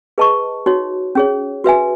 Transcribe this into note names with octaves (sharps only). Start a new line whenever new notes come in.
G#4 B4 D#5 A5 C#6
D#4 F#4 C#5
C#4 G#4 C#5
F#4 B4 E5 G#5